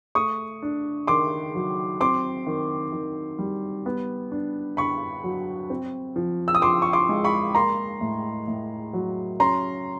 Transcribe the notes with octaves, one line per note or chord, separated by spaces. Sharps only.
A3 C#6 D#6
D4
D#3 C6 D6
F#3
C4 C6 D6
D#3
D#3
G3
B3
D4
D3 B5 C#6
F#3
C4
F3
E6
D#6
F3 C6 D6
C#6
C6 D6
G#3
B5 C#6
A#3 A#5 C6
A2
A2
F#3
C#4 A#5 C6